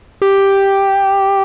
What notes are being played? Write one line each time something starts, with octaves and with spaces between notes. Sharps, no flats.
G4